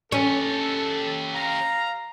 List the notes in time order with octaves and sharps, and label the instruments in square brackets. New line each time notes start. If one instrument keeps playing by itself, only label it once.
[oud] C#4 [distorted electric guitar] G4 C#5 [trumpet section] A4
[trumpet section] F5 A#5